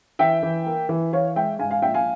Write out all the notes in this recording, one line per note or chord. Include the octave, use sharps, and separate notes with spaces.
E3 E5 G5
E3
A#3
E3
E3 C#5 F5
G#3 E5 G5
G#2 F5 G#5
F5 G#5
A#1 E5 G5
F5 G#5